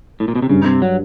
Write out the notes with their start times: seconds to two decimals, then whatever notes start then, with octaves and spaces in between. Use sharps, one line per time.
0.20 A2
0.28 A#2
0.35 B2
0.42 C3
0.49 G2 C#3
0.66 C3
0.82 F#3